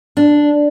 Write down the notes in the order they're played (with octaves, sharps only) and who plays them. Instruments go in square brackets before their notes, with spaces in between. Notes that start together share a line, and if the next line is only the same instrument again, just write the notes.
[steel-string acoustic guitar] D4